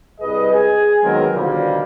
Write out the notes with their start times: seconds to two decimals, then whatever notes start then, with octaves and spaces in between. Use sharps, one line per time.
0.21 C2 G3 G#4 B4 D#5
0.53 G#4 G#5
1.03 D#3 F#3 G#3 B3 C4 A#4
1.33 B2 D3 D#3 F3 G3 A#3